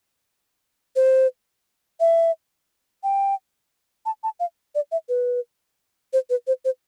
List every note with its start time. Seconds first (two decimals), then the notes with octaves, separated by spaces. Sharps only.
0.96 C5
2.00 E5
3.03 G5
4.06 A5
4.23 A5
4.40 F5
4.75 D5
4.92 E5
5.09 B4
6.13 C5
6.30 B4
6.47 C5
6.65 C5